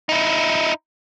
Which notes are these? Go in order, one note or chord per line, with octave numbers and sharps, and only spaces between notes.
D#4 E4